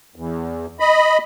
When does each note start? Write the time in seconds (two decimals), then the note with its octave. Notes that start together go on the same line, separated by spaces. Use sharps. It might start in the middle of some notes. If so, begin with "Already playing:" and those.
0.16 E2
0.80 D#5 B5